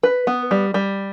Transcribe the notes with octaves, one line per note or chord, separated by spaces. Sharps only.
B4
B3
G3
G3